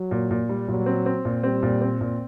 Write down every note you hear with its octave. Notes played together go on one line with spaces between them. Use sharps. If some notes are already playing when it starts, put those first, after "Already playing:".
Already playing: F#3
A#2
A#2
G3
A#2 F#3
C4
C4
A#2
G3 C4
A#2
C4
A#2